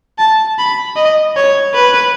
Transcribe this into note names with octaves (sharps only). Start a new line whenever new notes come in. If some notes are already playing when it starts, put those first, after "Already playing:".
A5
B5
D#5
C#5
B4